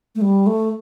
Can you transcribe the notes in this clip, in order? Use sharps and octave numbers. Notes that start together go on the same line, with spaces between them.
A3
G3
A3